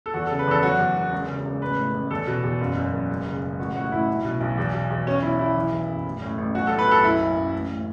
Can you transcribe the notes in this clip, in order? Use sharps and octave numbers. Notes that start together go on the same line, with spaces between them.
A4
E2 F#4
A4
C#3
B4
E2 A4
F#3 F#4
E2
E1
C#2
C#3
C#2
A1 B4
A2
A1
E2 A4
B2
E2
F#1
F#2
F#1
C#2
C#3
C#2
A1 F#4
A2 F#4
A1 E4
B1
B2
B1
E2
B2
E2
B1 C#4
B2 E4
B1 E4
E3
E2
F#1
A1
A2
A1
B1 F#4
A4
A2
B4
B1 A4
F#1 E4
F#2
F#1
A1
A2